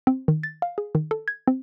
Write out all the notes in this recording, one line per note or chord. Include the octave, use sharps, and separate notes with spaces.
C4
D#3
A6
F5
G#4
D#3
A4
G#6
C4